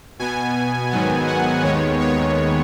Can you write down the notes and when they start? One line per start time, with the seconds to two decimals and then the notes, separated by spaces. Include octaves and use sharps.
0.19 B2 B3 G#5
0.91 G#2 D#3 F#3 B3
1.27 F#5
1.63 D#2 D#3 G#3 B3 C#5
2.00 C#5